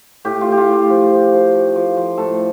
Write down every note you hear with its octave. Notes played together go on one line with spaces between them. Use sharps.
A2 G4
F4
A2 G4
F4
A2 G4
F3
F3
F3
F3
F3
F3
A2 A4